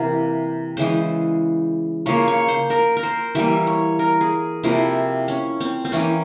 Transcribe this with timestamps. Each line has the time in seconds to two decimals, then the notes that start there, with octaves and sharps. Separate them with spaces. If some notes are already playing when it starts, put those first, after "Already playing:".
Already playing: C3 E3 A#3 A#4
0.77 C#3 E3 G#3 C5
2.06 C#3 F3 A#3 C#5
2.28 C#5
2.48 C5
2.70 A#4
2.97 A#4
3.03 C5
3.35 E3 G3 A#3 E5
3.67 C#5
3.99 A#4
4.21 G#4
4.63 C3 F3 A#3 E4
5.28 C#4
5.60 C4
5.85 C4
5.92 E3 A#3 C#4